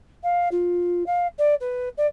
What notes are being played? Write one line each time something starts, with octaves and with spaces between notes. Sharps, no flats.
F5
F4
F5
D5
B4
D5